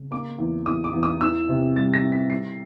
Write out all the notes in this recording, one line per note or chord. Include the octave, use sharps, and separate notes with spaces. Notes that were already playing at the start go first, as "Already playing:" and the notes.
Already playing: C#3
A#3 D6
E2
E2 D#6
D6
E2
D#6
E3 E6
C3
G3 A6
A#6
E3
B6
G3 C7